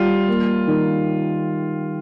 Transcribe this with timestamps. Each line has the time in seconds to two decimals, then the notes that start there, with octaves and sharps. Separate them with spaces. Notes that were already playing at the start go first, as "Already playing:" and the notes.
Already playing: G3 F4 G4
0.29 A#3
0.67 D#3